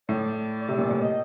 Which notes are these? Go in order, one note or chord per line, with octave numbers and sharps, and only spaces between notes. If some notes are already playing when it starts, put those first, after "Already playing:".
A2 D5
C3
A#2
A2
D#5